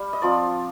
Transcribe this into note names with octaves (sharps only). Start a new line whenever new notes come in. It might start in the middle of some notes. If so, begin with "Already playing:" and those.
Already playing: G3 F5
D#5
F3 C4 F4 D5